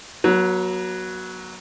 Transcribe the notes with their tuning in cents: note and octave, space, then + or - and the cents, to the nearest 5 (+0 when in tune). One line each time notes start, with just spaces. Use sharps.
F#3 +0 B3 -45